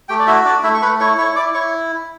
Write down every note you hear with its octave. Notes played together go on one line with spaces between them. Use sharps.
A3 G4 G5
D5
E4 F#4 E5
D4 D5
A3 E4 E5
C#6
A3 B4 B5
E4 C#5 C#6
E4 C#5 C#6
E4 D5 D6
E4 C#5 C#6